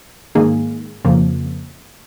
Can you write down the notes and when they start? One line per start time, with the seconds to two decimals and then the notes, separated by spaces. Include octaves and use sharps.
0.35 G#2 D#3 A#3 D#4 G#4
1.05 F2 C#3 F3 A#3